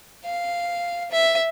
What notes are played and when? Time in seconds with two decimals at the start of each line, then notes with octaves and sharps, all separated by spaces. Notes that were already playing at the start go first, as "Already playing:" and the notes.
0.25 F5
1.11 E5